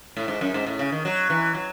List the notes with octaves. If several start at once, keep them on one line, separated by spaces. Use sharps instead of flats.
A2
G#2
F#2
G#2
A2
C#3
D#3
F#3
E3
F#3